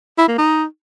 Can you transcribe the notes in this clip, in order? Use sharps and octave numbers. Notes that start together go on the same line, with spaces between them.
E4
A#3
D#4